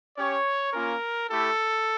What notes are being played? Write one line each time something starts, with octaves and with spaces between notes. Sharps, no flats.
C#4 G4 C#5
A#3 C#4 F4 A#4
A3 E4 G4 A4